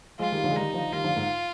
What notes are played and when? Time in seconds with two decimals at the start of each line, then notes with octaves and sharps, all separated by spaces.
0.19 F3 G#3 F4
0.32 D#3 G3
0.44 D3 F3
0.50 G#3
0.56 D#3 G3 D#4
0.73 D3 F3
0.92 D#3 G3 F4
1.04 D3 F3
1.16 G#2